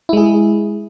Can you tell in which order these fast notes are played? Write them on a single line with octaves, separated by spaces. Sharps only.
E4 G#3 G#4